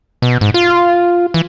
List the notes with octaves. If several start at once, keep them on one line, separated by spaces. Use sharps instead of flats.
B2
G#2
F4
E3